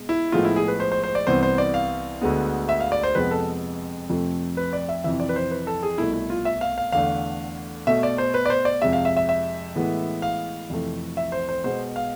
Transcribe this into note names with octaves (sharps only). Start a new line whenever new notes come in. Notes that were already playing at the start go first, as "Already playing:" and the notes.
Already playing: B2 G#3
E4
A2 F3 G#3 B3 F4
E4
G#4
B4
C5
C5
C5
D5
C2 C3 E3 B3 C5
C5
D5
F5
D2 D3 G#3 B3
E5
F5
D5
C5
F2 C3 G#3 B3 B4
A4
F2 C3 F3 A3
B4
D5
E5
F2 C3 E3 E5
D5
B4
C5
B4
A4
G#4
C2 B2 A3 E4
E4
F4
E5
F5
F5
E2 D3 A3 F5
B2 A3 E5
D5
C5
B4
D5
C5
D5
F2 C3 G#3 E5
F5
E5
E5
E5
A2 E3 G#3 B3
F5
F2 C3 E3 A3
E5
C5
C5
B2 G#3 B3 C5
F5